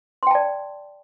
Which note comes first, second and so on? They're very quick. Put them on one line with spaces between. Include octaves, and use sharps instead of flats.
C6 G5 A5 D5